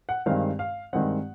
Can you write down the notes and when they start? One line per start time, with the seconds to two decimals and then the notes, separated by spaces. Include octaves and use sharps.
0.09 F#5
0.26 G2 D#3 G#3 C4 F5
0.59 F5
0.93 G2 D#3 G#3 C4 F#5